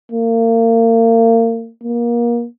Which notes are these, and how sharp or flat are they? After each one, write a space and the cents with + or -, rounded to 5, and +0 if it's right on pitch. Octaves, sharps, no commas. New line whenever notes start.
A#3 -35
A#3 +25